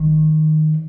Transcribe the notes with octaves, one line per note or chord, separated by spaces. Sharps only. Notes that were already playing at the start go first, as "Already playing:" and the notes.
Already playing: D#3